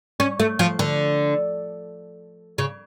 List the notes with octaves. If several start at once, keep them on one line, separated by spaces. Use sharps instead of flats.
C#4
A3
F3
D3
C#3